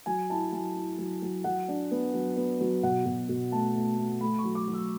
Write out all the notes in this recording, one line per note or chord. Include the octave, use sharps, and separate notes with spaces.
F#3 G#5
E4 A5
F#3 G#5
E4
F#3
F#3
F#3 F#5
D4
B3
F#3
B3
F#3
B2 F#5
B2
B2
A3 A5
A3
A3
A3 B5
C#6
F#3
D6
F#3
E6